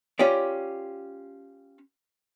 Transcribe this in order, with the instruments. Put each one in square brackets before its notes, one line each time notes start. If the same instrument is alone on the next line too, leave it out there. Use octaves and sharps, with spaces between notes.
[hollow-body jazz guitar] C#4 F4 G4 D5